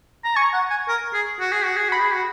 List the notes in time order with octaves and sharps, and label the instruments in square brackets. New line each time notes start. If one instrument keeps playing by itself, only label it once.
[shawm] A#5
[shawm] G#5 [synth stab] C#6
[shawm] F#5
G#5
A#4
G#4
F#4
G#4
F#4
G#4
[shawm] F#4 [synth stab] B5
[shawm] G#4
F#4